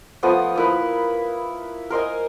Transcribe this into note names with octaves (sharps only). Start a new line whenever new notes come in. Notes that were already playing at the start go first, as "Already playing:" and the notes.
F3 A3 B3 D#6
A#3 E4 B4
A#4 C5 D#5 G#5